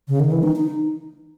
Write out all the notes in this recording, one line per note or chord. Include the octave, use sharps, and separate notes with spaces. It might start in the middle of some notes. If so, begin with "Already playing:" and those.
C#3
D#3
E3
D#4
D#4